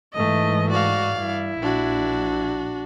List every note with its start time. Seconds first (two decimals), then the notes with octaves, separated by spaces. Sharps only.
0.14 G#2 E3 A3 D#5
0.70 F#4 D5 F5
1.18 G2 E4
1.62 A#1 D4 F#4